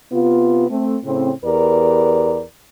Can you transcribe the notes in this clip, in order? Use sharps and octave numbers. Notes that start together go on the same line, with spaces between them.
C3 B3 F4
A3 C4
A2 C#3 C4
E2 G4 A#4 B4 D5